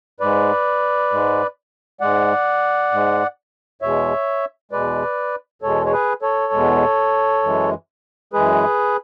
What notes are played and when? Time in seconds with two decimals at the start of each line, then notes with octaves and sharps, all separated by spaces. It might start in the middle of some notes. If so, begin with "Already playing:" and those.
0.20 G#2 G#3 B4 D5
1.11 G#2 G#3
2.00 G#2 G#3 D5 F#5
2.92 G#2 G#3
3.82 E2 B2 G#3 C#5 E5
4.71 E2 B2 G#3 B4 D5
5.62 E2 B2 G#3 A4 C#5
5.86 C#5
5.92 G#4 B4
6.22 A4 C#5
6.53 E2 B2 G#3
7.43 F#2 E3 G#3
8.33 F#2 E3 G#3 G#4 B4